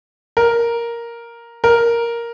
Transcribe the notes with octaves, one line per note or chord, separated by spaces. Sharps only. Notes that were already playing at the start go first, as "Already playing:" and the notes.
A#4
A#4